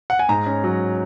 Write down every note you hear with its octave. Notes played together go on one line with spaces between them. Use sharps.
F#5
G#5
G#2 A#5
C#4
F#3